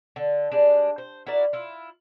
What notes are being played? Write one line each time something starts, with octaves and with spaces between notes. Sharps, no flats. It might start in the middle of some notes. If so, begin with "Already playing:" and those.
D3
G3 G#3 D4
C5
E4 F#4 A#4 D5
E4 F4